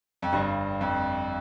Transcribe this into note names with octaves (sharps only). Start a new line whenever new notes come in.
F2
G1 G2
F2